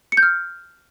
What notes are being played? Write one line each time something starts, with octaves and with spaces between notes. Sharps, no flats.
C#7
G6
F6